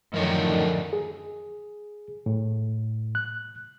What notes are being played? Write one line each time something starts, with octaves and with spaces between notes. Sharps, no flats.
F#2 A2 D3 D#3 F3 A#4 C#5
G#4
A2
F#6